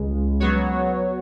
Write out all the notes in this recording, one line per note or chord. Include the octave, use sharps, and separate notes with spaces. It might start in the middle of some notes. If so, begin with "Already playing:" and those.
Already playing: C#2 C#3 G#3
F#3 B3 F#4 C#5